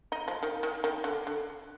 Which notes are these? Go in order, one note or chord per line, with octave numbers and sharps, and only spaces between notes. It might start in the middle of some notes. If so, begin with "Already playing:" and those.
D#4
F3
D#3
D#3
D#3
D3
D3